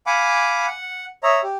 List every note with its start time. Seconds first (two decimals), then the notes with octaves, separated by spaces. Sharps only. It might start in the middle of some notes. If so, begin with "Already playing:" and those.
0.06 F5 F#5 G#5 B5 D6
0.67 F#5
1.23 C#5 D#5 E5 A#5
1.43 G4